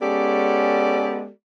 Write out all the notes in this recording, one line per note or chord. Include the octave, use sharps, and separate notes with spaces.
G#3 B3 C#4 G4 A4 D5